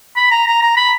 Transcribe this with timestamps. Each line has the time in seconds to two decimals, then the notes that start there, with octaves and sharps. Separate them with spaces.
0.17 B5
0.31 A#5
0.47 A#5
0.62 A#5
0.76 B5